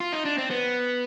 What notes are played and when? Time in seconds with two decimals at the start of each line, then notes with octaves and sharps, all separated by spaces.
0.00 F4
0.12 D#4
0.25 D4
0.38 C4
0.51 B3